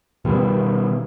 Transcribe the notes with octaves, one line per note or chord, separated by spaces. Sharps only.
B2 D#3 G3 B3